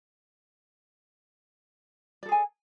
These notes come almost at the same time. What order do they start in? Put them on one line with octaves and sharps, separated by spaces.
D5 A4 G#4 G#5